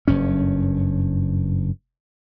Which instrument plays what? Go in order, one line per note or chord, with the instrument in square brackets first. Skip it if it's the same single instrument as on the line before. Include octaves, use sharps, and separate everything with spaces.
[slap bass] F#1 G2 C#4